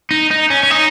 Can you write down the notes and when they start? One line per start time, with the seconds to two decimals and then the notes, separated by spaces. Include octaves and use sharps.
0.11 D#4
0.31 D#4
0.50 C#4
0.63 C#4
0.71 D#4